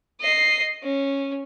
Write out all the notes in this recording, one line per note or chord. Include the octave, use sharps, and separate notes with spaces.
D#5 C7
C#4